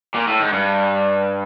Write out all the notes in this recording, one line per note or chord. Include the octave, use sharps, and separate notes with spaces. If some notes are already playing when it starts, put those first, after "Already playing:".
A#2
A2
G#2
G2